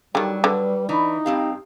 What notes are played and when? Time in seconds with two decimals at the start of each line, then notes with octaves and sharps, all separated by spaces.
0.15 D3 D#3 F#3 G3 G4
0.44 D3 B4
0.89 E3 D4 D#4
1.26 G2 C4 G4 F5